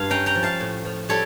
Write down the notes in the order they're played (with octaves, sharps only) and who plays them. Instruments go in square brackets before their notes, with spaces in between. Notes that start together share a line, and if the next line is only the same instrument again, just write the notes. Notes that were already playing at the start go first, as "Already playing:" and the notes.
Already playing: [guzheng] G2 F5
C#4 G5 A#5
G5 A#5
F3
F5 A5
A2
F3
G3 A4 C#5